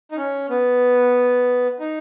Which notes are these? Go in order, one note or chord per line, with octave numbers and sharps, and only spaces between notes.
D#4
C#4
B3
D#4